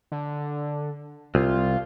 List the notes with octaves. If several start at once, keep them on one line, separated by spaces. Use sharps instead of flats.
D3
C2 F4